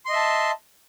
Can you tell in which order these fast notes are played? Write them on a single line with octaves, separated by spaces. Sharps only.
C6 D#5 E5 A5